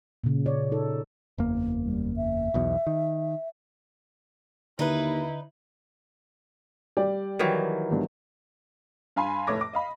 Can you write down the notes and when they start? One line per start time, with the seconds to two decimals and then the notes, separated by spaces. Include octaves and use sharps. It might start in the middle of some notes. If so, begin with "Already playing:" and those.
0.24 A#2 C#3
0.46 C#5 D5
0.72 D#4 A4
1.38 F#1 E2 A#3
1.85 G3
2.16 E5
2.54 B1 E2 B2
2.87 D#3
4.79 D#2 D3 D#4 E4 B4
6.97 G3 D5 G5
7.39 D#3 E3 F#3
7.91 G1 G2
9.16 G2 F5 G#5 B5 C6
9.47 F1 A2 A3 C#5 D6 A#6
9.61 D6
9.73 D#5 F5 B5